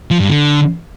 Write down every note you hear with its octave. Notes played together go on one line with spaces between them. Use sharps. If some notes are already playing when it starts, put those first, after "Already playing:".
F3
G2
D3